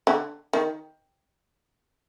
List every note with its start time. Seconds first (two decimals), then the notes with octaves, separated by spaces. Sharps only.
0.07 D3
0.53 D#3